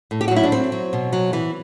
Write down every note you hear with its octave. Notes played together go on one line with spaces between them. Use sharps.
A2
G4
F#4
F#3
E4
D4
F#3 C4
F#3
B2
F#3
E3